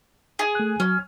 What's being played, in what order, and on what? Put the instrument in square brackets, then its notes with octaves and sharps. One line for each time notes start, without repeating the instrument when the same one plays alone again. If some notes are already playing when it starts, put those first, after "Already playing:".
[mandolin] G#4
[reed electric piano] A3 F#6
[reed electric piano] F#3 [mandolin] C#4